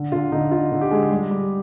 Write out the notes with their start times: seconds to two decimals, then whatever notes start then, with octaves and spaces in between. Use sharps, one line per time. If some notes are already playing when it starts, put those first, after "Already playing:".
Already playing: D3
0.12 D3 F4
0.32 D3 D#4
0.51 D3 F4
0.72 D3
0.81 G4
0.91 G#3
1.11 G3
1.31 G3